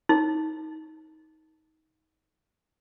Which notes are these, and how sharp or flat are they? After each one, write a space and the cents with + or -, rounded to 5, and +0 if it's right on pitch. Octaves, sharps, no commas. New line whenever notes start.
D#4 +20